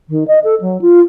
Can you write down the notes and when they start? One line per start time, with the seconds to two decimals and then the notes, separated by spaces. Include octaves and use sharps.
0.09 D#3
0.27 D#5
0.44 A4
0.61 F#3
0.81 F4